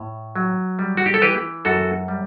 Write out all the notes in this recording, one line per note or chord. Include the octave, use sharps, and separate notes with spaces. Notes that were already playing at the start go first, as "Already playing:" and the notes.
Already playing: A2
F#3
G3
F#4
G4
A4
E3 G4 B4
F#2 F#4 A4
G3